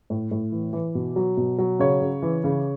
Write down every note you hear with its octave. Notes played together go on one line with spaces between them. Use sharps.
A2
A2
E3
E3
B2
F#3
B2
F#3
C#3 C#5
C#3
E3
C#3